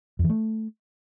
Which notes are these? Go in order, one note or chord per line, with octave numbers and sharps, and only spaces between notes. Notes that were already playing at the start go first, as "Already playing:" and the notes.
F2
E3
A3